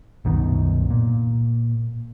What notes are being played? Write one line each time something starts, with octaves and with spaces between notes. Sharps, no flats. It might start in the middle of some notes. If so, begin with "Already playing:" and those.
C2 F#2 B2 D#3
A#2